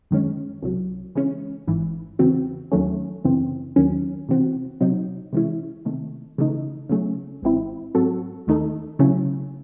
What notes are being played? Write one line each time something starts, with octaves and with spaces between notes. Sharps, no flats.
F#2 D#3 G#3 C#4
C2 C3 F#3
C#3 E3 G#3 C#4
G#1 G#2 E3
E2 C#3 E3 C4 F#4
D#2 D#3 F#3 A3 C#4
F#2 C#3 E3 C4
D#2 D#3 F#3 C#4
C3 E3 C4 F#4
C3 F#3 C4 D#4
C3 E3 G#3 C#4 E4
C3 D#3 A3
C#3 E3 A3 D#4
C#3 F#3 A3 C#4
A1 G#2 E3 C4 E4
G#2 F#3 C4 F#4 A4
D#2 D#3 A3 D#4 A4
C#3 F#3 A3 C#4 E4